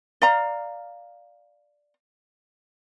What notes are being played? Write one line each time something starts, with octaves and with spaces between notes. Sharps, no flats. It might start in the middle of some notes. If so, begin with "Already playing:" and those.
D5 F5 A#5